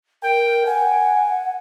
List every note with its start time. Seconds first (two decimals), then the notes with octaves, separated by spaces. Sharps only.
0.23 A#4 G5
0.66 F#5 G#5